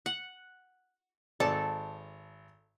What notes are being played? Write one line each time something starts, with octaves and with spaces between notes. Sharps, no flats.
F#5
G#1 A4 D5